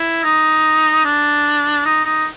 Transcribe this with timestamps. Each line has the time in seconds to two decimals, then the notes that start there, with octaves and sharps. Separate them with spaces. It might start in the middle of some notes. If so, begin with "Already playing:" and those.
Already playing: E4
0.24 D#4
1.05 D4
1.85 D#4
2.05 D#4